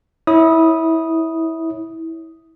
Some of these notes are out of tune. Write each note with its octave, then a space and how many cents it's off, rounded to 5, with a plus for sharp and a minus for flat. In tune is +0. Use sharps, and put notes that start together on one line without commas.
E4 -20 C#5 +0 D#6 +0